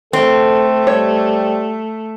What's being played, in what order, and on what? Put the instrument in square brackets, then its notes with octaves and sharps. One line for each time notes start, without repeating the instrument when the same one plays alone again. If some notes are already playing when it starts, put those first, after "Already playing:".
[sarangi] A3 [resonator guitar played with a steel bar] C4 [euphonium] A4
[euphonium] G3 [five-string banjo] C#5